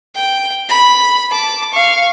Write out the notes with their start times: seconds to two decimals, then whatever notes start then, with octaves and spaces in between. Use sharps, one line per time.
0.15 G5
0.69 B5
1.31 A5 D6
1.73 F5 C#6